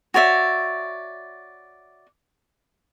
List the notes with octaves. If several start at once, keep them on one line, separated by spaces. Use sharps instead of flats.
F#4 C#5 D5 E5